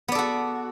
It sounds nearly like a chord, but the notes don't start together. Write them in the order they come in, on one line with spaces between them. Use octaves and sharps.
B3 D5 A4 F#4